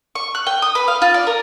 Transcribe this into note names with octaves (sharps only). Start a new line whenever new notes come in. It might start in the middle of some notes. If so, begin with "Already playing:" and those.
C#6
F#6
G5
D#6
B4
F5
F4
D5
A#4